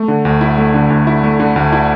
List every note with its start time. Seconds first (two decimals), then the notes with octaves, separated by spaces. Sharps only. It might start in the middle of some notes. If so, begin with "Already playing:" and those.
Already playing: A3
0.08 D3
0.25 D2
0.41 E4
0.58 A3
0.74 D3
0.90 D2
1.07 E4
1.24 A3
1.40 D3
1.56 D2
1.73 E4